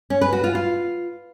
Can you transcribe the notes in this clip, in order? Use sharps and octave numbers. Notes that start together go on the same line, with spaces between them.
C#4
B4
F#4
F4
F4